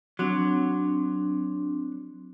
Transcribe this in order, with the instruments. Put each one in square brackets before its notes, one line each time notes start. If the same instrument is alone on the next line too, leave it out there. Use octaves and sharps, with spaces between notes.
[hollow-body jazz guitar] F#3 [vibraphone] C4 D4